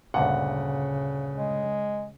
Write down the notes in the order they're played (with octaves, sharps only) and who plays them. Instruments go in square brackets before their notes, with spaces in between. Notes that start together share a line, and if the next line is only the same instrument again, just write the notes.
[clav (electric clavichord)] D2 G2 A#2 [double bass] C#3 [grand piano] F#5
[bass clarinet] G#3